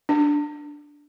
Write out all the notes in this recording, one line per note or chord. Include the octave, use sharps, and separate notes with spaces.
D4